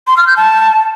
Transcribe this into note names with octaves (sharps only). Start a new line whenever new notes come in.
C6
F6
G6
A5